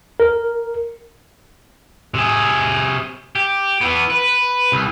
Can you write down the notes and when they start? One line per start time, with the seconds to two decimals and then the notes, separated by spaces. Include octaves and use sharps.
0.20 A#4
2.14 C3 G#4
3.36 G4
3.81 E3 B3
4.10 B4
4.72 C2